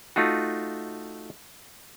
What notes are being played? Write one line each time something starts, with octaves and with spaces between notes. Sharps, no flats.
A3 D#4 F4 F#4